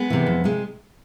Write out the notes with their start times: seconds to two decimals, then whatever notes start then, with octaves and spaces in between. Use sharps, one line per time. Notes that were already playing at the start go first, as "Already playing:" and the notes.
Already playing: G#3 B3
0.10 C3 E3
0.26 F2
0.44 C3 G#3